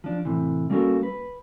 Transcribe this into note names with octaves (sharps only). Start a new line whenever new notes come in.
F3 D4
A2 C3 E3
G3 A#3 C#4 F#4 A4 A#4
B4